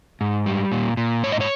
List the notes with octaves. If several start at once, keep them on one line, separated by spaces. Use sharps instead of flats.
G#2
G3
A#2
A#2
G#2 C#5
D#5
C#5